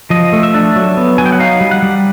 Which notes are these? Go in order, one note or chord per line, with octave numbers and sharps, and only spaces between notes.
F3 D#5
A3
E5
D4
F#3
B3
F#3 G#5
G5
F#5
D#4 F5
G3
F#5
G3